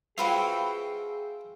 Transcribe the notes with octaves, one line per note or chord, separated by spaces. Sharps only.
C4 F4 F#4 G#4 B4 E5 F5 G5